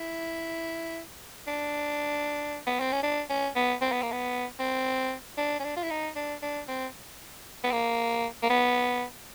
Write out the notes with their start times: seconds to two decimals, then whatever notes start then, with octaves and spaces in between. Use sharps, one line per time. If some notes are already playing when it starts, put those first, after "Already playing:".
Already playing: E4
1.47 D4
2.67 B3
2.80 C4
2.92 C#4
3.03 D4
3.30 C#4
3.56 B3
3.82 C4
3.92 B3
4.02 A#3
4.12 B3
4.59 C4
5.38 D4
5.60 C#4
5.64 D4
5.77 F4
5.83 E4
5.90 D#4
6.16 D4
6.43 D4
6.68 C4
7.64 B3
7.72 A#3
8.43 A#3
8.50 B3